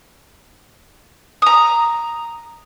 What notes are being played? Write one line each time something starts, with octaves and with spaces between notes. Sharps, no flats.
A#5 D#6